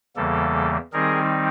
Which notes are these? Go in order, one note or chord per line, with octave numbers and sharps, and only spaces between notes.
E2 C#3 E3 G3 A#3 A4
D#3 G3 C4 D#4 G#4 A#4